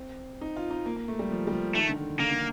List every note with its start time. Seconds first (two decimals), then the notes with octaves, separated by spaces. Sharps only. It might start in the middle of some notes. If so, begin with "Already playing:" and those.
Already playing: C4
0.41 D#4
0.56 F4
0.71 D#4
0.86 A#3
0.96 A#3
1.08 A3
1.19 G3
1.31 F3
1.47 G3
1.52 F3
1.75 D#3 A3
1.89 D3
1.97 D#3
2.20 D3 A#3
2.31 D3